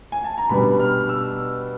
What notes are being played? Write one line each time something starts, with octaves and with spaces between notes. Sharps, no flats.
G#5
A5
A#5
B2 G3 B3 D4 B5
F6
E6